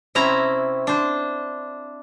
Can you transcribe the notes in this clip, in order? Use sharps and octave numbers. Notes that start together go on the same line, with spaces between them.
C3 C4 C#4 E4 A#5
D4 C5